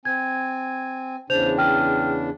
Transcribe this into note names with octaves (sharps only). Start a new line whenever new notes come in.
C4 G#5 G#6
E2 C#3 D4 C5 G6 F7
G5 F6